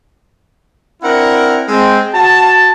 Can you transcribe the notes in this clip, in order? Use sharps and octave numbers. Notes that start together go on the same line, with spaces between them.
C4 D4 E4 A#4 F#5
G#3 C4
F#4 A5